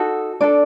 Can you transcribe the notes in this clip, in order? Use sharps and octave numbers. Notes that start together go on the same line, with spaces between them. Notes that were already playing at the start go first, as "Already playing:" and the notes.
Already playing: D#4 F#4 A4
D4 A4 D5